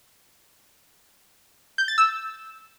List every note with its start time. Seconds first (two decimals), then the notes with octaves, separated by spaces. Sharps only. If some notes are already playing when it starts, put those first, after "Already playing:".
1.78 G6
1.88 A6
1.98 E6